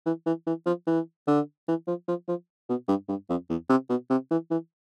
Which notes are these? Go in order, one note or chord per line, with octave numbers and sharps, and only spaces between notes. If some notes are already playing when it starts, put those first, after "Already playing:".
E3
E3
E3
F3
E3
D3
E3
F3
F3
F3
B2
G2
G2
F2
E2
C3
B2
C3
E3
E3